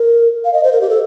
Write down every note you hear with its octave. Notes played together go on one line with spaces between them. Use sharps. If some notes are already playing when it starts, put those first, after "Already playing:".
Already playing: A#4
F5
D#5
C5
A#4
G4
A4